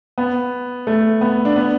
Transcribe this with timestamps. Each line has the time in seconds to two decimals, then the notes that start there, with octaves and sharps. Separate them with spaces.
0.18 B3
0.87 A3
1.21 B3
1.45 D4
1.56 B3